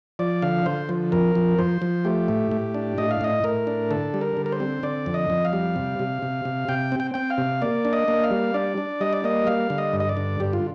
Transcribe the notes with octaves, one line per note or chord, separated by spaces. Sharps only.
F3 D5
D3 F5
D3 C5
F3
F2 A#4
F3
F3 C5
F3
A3 G4
A2
A2
D4
A2 D#5
F5
A2 D#5
A2 A#4
D4
D3 A4
G3
A#4
D3
A#4
C5
C4
D3 D5
F2
D#5
F2
F5
G3
C3
C3
C3
C3
C3 G5
C4
G5
C4 G5
F5
C3
A#3 D5
D4
D#5
A#3
F5
G3
D4 D5
D4
G3 D#5
D5
A#3 D#5
G3 F5
D3
D#5
G2
D#5
D5
D3
G2 G4
F4